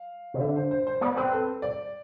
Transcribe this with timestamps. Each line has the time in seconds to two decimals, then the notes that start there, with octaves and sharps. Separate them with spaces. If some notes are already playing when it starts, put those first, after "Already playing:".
Already playing: F5
0.34 C3
0.40 D3 E5
0.56 C5
0.71 C5
0.87 C5
1.01 B3 D5
1.16 C4 B4
1.32 A4
1.62 D5